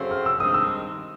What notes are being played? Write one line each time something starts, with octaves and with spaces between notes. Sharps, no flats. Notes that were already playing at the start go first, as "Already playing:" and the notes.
Already playing: F#2 C#3 F#3 A3 C4
F6
E6
G2 D#3 G#3 C4 D#4 D#6
E6